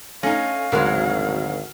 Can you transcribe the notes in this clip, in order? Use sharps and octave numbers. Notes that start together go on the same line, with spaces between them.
A3 C#4 D#4 F5 G#5 A#6
G#1 D2 C#3 F#3 G#3 A#4 F6